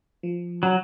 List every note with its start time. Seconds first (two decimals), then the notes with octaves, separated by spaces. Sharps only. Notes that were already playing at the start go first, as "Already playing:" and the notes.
0.23 F3
0.63 F#3